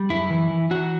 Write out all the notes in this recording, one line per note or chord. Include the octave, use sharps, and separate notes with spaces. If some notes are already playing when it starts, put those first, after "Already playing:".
Already playing: G3
F#2 E4
E3
E3
E3 F#4